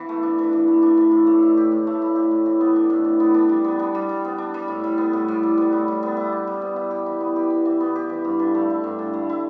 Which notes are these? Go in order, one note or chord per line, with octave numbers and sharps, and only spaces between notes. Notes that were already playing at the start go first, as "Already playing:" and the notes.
Already playing: E3 B3
A3
D4
E3
E3
A3
D4
E3
A2
A3
E4
G4
A2
A3
E4
G4
A2
E3
B3
D4
A2
E3
B3
D4
G3
B3
D4
G3
G3
B3
D4
G3
A2
G3
B3
A2
A2
G3
B3
A2
G3
B3
E4
G4
G3
B3
E4
G4
E3
B3
G4
E3
E3
B3
G4
E3
G2
D3
A3
E4
G2
D3
A3
E4